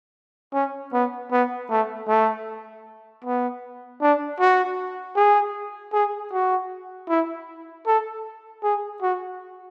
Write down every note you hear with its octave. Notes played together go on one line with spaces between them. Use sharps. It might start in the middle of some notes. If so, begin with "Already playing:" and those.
C#4
B3
B3
A3
A3
B3
D4
F#4
G#4
G#4
F#4
E4
A4
G#4
F#4